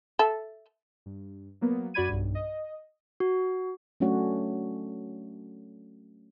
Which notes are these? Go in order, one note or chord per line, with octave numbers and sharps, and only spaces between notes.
A4 E5
G2
F#3 A#3 B3
F#2 F#4 D5 B5 G#6 D#7
B1 G2
D#5
F#4
F#3 A3 C#4 D4 F#4 C#5